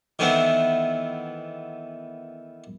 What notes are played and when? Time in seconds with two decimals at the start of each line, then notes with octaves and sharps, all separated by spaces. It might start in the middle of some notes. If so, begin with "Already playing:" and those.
0.19 D#3 E3 A3 B3 C4